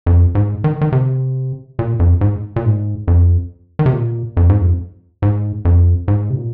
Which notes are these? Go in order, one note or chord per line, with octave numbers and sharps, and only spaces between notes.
F2
G#2
D#3
D#3
C3
A#2
F2
G#2
A#2
G#2
F2
D#3
C3
A#2
F2
G#2
F2
G#2
F2
G#2
C3
A#2